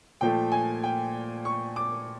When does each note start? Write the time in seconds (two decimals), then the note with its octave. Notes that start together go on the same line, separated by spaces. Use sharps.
0.21 A#2 F3 A3 G5
0.52 G#5
0.83 G5
1.45 C#6
1.76 D6